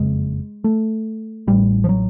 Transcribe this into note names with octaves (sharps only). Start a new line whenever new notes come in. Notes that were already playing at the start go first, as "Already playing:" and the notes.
Already playing: F#1 F2 C#3 G#3
A3
A1 A2 G3
F3
F#3